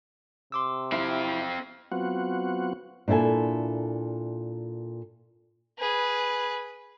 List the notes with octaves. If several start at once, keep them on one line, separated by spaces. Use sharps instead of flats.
C3 C6 D6 E6
C4 E4 F5
F#3 B3 C4 F4 F#4 F#5
A#2 D4 E4 A4 G#5
G#4 B4